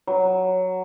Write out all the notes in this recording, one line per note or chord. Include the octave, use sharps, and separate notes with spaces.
F#3